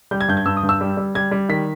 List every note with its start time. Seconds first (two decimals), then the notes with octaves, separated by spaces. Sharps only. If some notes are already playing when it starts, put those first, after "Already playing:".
0.11 G3 G6
0.21 G#6
0.28 G2 G6
0.37 G#6
0.46 G2 E6
0.57 D#6
0.63 G2
0.69 E6
0.81 G3
0.97 G3
1.15 G3 G#6
1.31 G3
1.49 D#3 B6